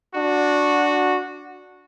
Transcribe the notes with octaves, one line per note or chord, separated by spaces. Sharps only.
D4 F#4